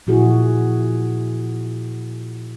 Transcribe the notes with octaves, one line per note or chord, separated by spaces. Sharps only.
A#2 F3 E4 F#4 G#4